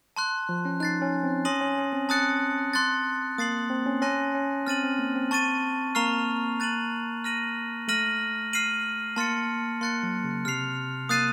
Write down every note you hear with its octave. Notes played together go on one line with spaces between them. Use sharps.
A5 C6 F#6
F3
C#4
D#4 F#6 A6 C7
C#4
C4
C#4 C6 D#6 A#6 D#7 F#7
C#4
C#4
C4
A5 D#6 F#6 A6 C#7
C6 F#6 A6
A#3 D#6 A6 C7 F#7
C4
C#4
C#4 A5 C6 F#6 A#6 D#7
C#4
C4 F6 A6 D#7 F#7
C4
A#3
C4
A5 C#6 A6 D#7
A#3 A#5 C#6 F6 C7 F7
F#6 A6 D#7 F#7
F6 A#6 D#7 F#7
A3 F6 A#6 D#7 F#7
F6 C7 D#7 F#7
A#3 A5 C6 F6 A6 C#7
A#3 C6 F#6 A6 C#7
F#3
C#3
C3 F6 C7 F7
A#3 D#6 F#6 A6 C7 D#7